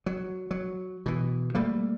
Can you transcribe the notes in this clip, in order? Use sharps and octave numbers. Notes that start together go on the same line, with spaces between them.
F#3
F#3
B2 E3
G3 A3 A#3